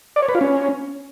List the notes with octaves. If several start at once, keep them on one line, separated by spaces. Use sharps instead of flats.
D5
C#5
B4
F4
C#4